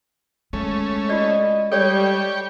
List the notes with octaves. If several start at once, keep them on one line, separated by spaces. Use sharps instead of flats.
G#3 A3 C#4
F4 F#4 D5 D#5
G3 G4 A4 C#5 D5 G5 C#6